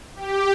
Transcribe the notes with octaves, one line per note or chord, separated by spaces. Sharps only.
G4